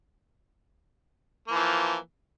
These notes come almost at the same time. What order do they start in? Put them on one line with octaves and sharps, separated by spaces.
A#3 F3 E3